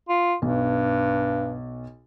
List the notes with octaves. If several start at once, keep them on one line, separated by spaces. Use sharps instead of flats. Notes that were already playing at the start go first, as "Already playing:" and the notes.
F4
B1 G2